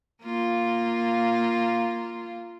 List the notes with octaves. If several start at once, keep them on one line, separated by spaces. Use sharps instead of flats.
A#3 F4